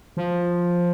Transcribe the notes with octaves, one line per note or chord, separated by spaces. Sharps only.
F3